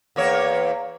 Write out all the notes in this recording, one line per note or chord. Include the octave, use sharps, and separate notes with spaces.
E2 A#3 C#5